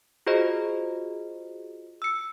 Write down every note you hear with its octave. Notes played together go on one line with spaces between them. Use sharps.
F4 F#4 G#4 C5 D#5
E6 C#7